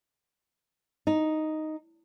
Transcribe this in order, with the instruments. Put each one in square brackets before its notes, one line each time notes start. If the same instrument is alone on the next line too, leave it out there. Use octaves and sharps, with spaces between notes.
[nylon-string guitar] D#4